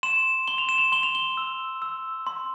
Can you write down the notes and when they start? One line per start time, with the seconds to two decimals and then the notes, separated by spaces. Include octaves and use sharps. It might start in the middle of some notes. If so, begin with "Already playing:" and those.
0.03 C6 E7
0.48 C6 G7
0.58 F7
0.69 E7
0.78 F7
0.92 C6 G7
1.03 F7
1.15 G7
1.37 E6
1.82 E6
2.27 C6